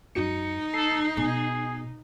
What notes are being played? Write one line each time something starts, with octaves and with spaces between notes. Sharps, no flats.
F#2 D#4 F#4 C#7
A4 C7
B2 G#4